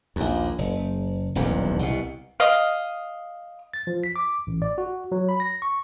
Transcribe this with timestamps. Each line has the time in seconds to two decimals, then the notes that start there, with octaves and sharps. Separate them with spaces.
0.16 A#1 D#2
0.58 F#1
1.35 D#1 B1 E2 G2
1.79 C2 B2
2.40 D#5 F5
3.74 A6
3.87 F3
4.04 B6
4.16 D6
4.47 A1
4.62 D5
4.78 F#4
5.12 F#3
5.29 B5
5.40 A#6
5.62 C#6